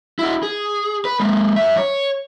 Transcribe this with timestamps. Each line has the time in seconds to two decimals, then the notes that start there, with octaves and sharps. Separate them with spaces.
0.19 E4 F#4
0.43 G#4
1.05 B4
1.20 G#3 A#3
1.56 F#2 E5
1.77 C#5